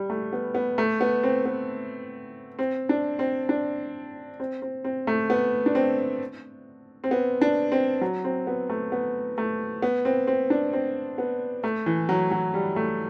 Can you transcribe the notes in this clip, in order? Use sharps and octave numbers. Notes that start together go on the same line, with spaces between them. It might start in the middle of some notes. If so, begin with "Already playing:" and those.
Already playing: G3
A3
B3
B3
A3
B3
C4
B3
C4
D4
C4
D4
C4
C4
C4
A3
B3
D4
C4
C4
B3
D4
C4
F#3
C4
B3
A3
B3
A3
B3
C4
C4
D4
C4
B3
A3
E3
F#3
F#3
G3
A3